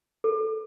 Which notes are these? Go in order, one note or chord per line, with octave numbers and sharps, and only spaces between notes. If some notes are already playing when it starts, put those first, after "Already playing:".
A4